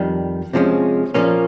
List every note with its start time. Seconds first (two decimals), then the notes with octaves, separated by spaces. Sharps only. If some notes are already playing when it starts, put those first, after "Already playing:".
Already playing: F2 D#3 G3
0.53 C3 F3 G#3 C#4
1.14 A#2 F3 A#3 C#4